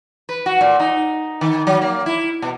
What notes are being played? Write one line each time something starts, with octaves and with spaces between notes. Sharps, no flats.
B4
F#4
A#2
D#4
D#3
F#3
A#3
E4
B2